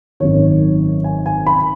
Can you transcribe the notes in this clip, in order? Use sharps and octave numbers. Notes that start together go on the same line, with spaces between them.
G#1 F#2 D#3 C#5
G#5
G#5
B5